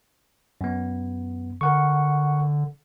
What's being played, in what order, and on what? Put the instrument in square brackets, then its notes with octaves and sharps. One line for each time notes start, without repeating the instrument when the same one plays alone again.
[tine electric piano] F#2 B3
[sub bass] D3 [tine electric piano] A#4 F#5 C#6